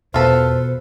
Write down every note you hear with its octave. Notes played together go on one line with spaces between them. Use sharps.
E2 B2 F4 A4 B4 C5